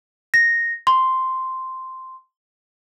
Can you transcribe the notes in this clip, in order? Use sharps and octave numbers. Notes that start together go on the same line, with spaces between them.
A#6
C6